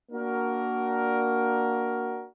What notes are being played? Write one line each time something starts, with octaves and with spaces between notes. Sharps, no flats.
A#3 D4 F#4 A#4